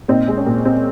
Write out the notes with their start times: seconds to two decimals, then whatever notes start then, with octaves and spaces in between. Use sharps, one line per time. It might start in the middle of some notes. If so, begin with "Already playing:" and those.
0.08 A#2 C4 D#4
0.28 G#3
0.37 C#4
0.46 A#2
0.65 C4